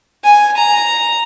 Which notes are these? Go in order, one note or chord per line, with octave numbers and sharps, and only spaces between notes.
G#5
A#5